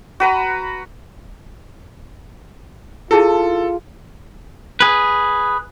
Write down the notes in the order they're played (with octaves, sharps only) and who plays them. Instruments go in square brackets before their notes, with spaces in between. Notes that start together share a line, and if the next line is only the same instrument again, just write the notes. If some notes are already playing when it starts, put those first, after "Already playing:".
[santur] F#4 B4 A#5
[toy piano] E4 G#4 A5 [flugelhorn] F4 [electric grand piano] A4
[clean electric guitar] G#4 B4